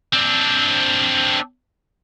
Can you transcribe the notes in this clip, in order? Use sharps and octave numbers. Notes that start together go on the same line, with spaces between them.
C4 D4